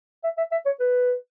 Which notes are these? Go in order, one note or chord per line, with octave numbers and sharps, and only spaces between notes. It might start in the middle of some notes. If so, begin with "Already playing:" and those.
E5
E5
E5
C#5
B4